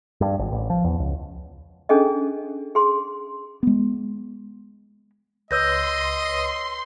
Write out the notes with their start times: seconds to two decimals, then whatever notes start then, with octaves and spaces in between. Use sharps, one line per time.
0.21 G2
0.39 G#1
0.52 A1
0.70 F3
0.84 E2
1.00 C#2
1.89 C#4 D4 G#4 A4 D#5
2.75 G#4 C6
3.63 G#3 B3
5.51 C#2 B4 C#5 D#5 C6 E6 G6 A#6